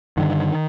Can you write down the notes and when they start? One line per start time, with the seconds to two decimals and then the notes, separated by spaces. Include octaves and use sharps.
0.17 G2 D3 D#3